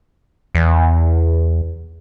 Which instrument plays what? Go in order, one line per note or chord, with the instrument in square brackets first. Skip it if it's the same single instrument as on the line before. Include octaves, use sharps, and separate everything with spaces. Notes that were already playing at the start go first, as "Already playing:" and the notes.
[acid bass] E2